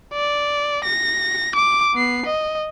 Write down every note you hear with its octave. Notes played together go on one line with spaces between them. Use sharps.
D5
A#6
D6
B3 C7
D#5